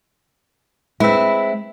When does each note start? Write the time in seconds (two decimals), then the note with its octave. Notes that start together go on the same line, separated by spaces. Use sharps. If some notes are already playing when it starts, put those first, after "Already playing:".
1.00 G#3 C4 E4 B4 E5